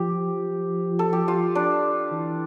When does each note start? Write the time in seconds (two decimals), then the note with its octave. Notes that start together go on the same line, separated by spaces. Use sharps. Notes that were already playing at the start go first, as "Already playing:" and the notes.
Already playing: F3 G4
0.99 A4
1.13 G4
1.28 F4
1.55 D4
2.12 E3